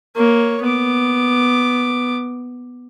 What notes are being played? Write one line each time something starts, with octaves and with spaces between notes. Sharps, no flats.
A#3 C#5
B3 D6